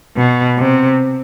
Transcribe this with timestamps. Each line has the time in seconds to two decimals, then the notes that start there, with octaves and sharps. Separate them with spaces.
0.17 B2
0.58 C3